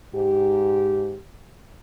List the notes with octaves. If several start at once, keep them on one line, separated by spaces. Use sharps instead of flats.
G#2 G4